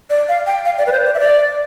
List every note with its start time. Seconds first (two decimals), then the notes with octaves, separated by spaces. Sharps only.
0.10 D5
0.29 F5
0.47 G5
0.65 F5
0.78 D5
0.87 B4
0.92 C5
1.06 D5
1.14 E5
1.20 D5